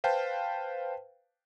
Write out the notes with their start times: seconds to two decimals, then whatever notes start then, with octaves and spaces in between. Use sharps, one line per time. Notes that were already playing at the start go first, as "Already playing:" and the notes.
0.04 B4 C5 F5 G5 A5